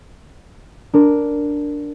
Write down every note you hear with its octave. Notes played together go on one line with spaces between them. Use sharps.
D4 A#4